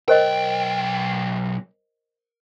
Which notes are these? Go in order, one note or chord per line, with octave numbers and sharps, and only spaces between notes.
B1 A#4 C5 D#5 G5